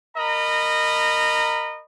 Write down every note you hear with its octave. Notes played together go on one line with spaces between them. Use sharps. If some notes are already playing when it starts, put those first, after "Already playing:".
A#4 D#5 A#5 B5